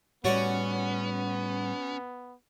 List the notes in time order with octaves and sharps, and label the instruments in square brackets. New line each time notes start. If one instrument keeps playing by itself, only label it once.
[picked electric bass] A2 G3 [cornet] B3 [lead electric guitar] C#4 [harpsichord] F#4 C#5 D5